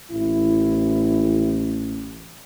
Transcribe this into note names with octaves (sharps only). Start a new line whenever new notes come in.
A1 E4